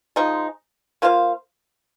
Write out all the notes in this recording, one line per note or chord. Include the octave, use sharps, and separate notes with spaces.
F3 G#3 D#4
A#3 F4 C5 F5